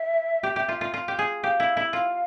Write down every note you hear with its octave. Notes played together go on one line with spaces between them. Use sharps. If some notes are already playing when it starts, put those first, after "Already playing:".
Already playing: E5
G4
G4
F4
F4
F4
G4
G#4
G4 F5
E4
E4
F4 F5